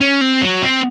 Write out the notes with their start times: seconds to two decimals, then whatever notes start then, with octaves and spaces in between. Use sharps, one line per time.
0.01 C#4
0.21 C4
0.42 F#3
0.62 C4